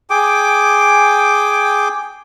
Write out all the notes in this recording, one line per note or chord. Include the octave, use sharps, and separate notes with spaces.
G#4 G5 D6